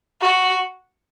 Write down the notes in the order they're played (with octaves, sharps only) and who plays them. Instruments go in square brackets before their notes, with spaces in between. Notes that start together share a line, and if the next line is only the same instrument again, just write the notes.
[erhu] F#4